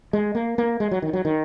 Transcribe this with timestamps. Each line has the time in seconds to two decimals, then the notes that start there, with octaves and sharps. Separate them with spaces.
0.13 G#3
0.35 A#3
0.58 A#3
0.80 G#3
0.91 F#3
1.02 D#3
1.13 F#3
1.25 D#3